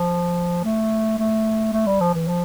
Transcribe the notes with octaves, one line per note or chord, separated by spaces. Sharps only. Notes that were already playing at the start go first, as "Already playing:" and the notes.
Already playing: F3
A3
A3
A3
G3
F3
E3
F3